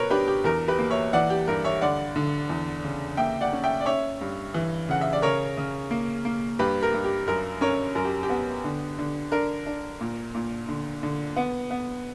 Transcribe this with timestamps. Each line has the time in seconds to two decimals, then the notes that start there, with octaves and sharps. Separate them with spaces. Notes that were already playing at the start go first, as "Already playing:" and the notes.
Already playing: B2 A#4 B4 C#5
0.10 D4 G4 B4
0.28 G4
0.44 E2 A#4
0.68 G4 B4
0.79 A#3
0.90 C#5 E5
1.13 E3 D5 F#5
1.30 G4
1.48 G2 A#4
1.64 C#5 E5
1.81 D3 D5 F#5
2.16 D3
2.49 E2
2.84 C#3
3.17 A#3 E5 G5
3.41 D5 F#5
3.53 C#4
3.64 E5 G5
3.81 D5
3.86 C#4 C#5 E5
4.21 G2
4.54 E3
4.89 C#3 F#5
5.01 E5
5.13 D5
5.22 C#3 A#4 C#5
5.57 C#3
5.91 A#3
6.25 A#3
6.59 G2 G4 B4
6.83 A#4
6.94 G2
7.04 G4
7.28 F#2 A#4
7.61 C#4 A#4 C#5
7.95 F#2 A#4
8.05 G4
8.23 G4
8.30 B3
8.64 D3
8.99 D3
9.32 D4 A#4
9.66 D4
10.01 A#2
10.35 A#2
10.69 D3
11.03 D3
11.36 B3
11.71 B3